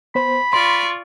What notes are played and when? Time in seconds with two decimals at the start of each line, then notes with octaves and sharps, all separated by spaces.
0.15 B3 C5 B5
0.53 F4 D5 C6 C#6